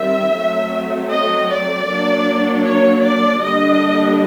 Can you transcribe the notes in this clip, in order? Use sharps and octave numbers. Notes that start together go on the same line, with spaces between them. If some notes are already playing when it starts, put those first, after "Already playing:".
Already playing: D#3 G3 C4 E5
F#3 A3 C4
D#5
D5
F#3 A#3 D4
C#5
D5
D3 G3 A#3 D4 D#5